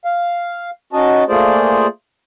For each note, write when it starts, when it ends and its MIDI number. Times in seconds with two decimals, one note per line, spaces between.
0.05 0.70 77
0.93 1.24 61
0.93 1.24 63
0.93 1.24 66
0.93 1.24 75
0.93 1.24 81
1.29 1.87 57
1.29 1.87 58
1.29 1.87 65
1.29 1.87 68
1.29 1.87 72
1.29 1.87 74